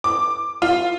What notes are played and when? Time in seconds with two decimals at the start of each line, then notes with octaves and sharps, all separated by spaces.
0.04 D6
0.62 F4